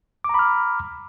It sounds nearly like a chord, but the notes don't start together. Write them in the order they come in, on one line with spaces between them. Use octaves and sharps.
D6 A#5 B5 F6